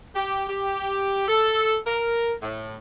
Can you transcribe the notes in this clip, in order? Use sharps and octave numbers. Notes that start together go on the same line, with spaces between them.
G4
G4
A4
A#4
A2